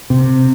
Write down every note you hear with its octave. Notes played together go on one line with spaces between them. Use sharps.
C3